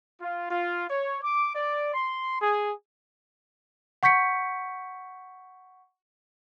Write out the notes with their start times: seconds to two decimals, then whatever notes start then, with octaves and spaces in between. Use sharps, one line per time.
0.21 F4
0.51 F4
0.90 C#5
1.24 D6
1.55 D5
1.94 C6
2.41 G#4
4.03 F#5 C#6 G6 B6 C#7